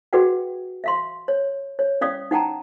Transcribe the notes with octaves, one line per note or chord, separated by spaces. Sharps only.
F#4 G#4 B4 D5 F#5 G5
E5 F5 C6
C#5
C#5
C#4 D5 F5 D#6
D#4 F#5 G5 A5 A#5